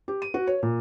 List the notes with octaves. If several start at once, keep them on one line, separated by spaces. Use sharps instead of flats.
G4
D#7
F#4
C#5
A#2